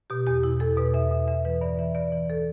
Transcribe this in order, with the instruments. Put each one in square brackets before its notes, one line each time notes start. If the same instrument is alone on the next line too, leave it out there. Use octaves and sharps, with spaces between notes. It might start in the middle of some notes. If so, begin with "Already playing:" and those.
[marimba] B2 G4
E2 G4
B2 E4
E2 A4
B2 B4
E2 E5
B2 E5
E2 E5
E3 B4
G2 D5
E3 E5
G2 D5
E3 D5
A4